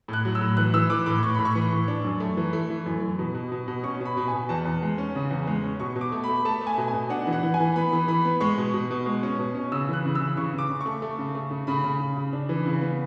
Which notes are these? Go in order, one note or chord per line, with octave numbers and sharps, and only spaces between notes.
A2
F#6
F#3
E6
A2
E3 F#6
E3 E6
E3 D6
A2 D6
A2 C#6
A2 B5
C#6
E3
A2
D4
F#2
A3
E3
A3
E3
F#2
E3
B2
B2
B2
B2
C#4 C#6
B2
B5
B2
G#5
B2
E2 A5
E2
G#3
C#4
C#3
E2
G#3
C#4
B2 C#6
B2
D6
A3
A3 B5
A3 A5
A3
G#5
B2
G#5
B2
D4 F#5
E3
F#5
E3
G#5
E3
B3 B5
E3
E3 B5
B3
G#3 C#6
B2
B2
B2
G#3
C#4
B2
C#4
C#3 E6
E3 F#6
C#3
E6
E3
C#3 C#6
C#3
D6
C#3
A3 C#6
A3
C#3
A3
C#3
C#3 B5
C#3
C#3
C#3
D4
E3
C#3
B3